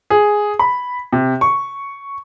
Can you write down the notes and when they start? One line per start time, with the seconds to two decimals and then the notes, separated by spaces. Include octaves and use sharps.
0.10 G#4
0.59 B5
1.13 C3
1.41 C#6